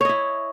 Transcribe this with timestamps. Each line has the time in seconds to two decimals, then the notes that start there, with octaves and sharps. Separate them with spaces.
0.01 C#5
0.05 D#5
0.09 E4